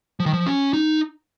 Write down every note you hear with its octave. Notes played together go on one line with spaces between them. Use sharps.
F3
D#3
F3
C#4
D#4